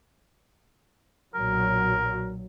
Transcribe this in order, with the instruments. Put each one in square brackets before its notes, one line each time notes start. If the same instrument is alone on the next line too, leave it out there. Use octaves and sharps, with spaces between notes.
[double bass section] B1 A#2 F#3 [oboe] A#4